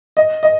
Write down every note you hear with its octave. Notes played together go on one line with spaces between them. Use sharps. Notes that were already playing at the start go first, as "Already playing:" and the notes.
D#5
D#5